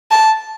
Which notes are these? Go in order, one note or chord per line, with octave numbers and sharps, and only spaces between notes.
A5